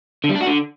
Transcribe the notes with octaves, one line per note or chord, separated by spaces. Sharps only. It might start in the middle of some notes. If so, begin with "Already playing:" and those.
D3
G3
D4
F#4
D3